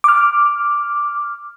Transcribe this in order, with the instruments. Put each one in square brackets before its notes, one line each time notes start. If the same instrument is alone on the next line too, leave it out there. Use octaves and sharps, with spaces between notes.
[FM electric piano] D6 F6